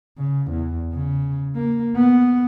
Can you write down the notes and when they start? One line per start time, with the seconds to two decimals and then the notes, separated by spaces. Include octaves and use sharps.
0.18 C#3
0.51 E2
0.92 C#3
1.55 A#3
1.96 B3